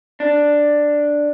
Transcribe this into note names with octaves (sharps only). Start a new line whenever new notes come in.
D4